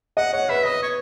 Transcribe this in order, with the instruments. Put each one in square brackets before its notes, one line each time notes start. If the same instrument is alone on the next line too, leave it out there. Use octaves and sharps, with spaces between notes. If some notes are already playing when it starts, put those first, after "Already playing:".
[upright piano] D#5 [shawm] F#5
[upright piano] C#5 [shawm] F#5
[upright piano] B4 [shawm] E5
[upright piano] B4 [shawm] D#5
[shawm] C#5